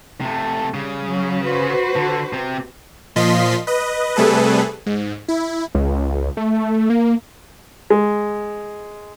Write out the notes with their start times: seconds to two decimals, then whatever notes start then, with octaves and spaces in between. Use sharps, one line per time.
0.21 C3 A3
0.74 C#3 G3
1.07 F#3 C#4
1.45 F#4 B4 C5
1.96 D3
2.33 C3 C4
3.16 A#2 F3 F4 D#5 C6 B6
3.67 B4 D#5
4.16 C3 G3 A3 G#4 A4 B4
4.86 G#2
5.28 E4
5.75 C#2
6.37 A3
6.90 A#3
7.90 G#3